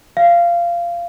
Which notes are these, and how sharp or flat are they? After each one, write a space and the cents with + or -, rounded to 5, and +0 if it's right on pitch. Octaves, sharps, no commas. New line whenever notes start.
F5 -20